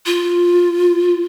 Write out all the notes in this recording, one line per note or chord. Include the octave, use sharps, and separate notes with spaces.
F4